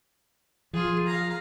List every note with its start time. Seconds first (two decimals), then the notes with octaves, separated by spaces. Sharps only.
0.73 F3 F4 G#4
1.07 F5 A#5